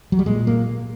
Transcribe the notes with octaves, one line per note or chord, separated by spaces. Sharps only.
F#3
G3
A#2 G#3
A#3